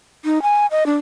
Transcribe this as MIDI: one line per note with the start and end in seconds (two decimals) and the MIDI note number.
0.25 0.42 63
0.43 0.66 80
0.71 0.86 75
0.86 0.96 62